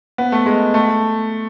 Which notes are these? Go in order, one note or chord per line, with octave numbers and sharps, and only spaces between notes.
B3
A3
G#3
A3